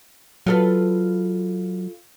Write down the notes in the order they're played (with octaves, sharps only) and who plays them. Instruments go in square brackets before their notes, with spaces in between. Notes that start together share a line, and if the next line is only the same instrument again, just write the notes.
[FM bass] F#3 [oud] F4 A4 B4